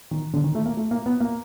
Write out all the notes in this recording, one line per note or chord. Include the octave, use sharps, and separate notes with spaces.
D#3
D3
D#3
A3
A#3
A3
A#3
B3
A#3